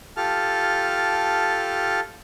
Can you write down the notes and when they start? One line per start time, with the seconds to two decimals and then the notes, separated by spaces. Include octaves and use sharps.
0.17 F4 G4 A4 A5 F6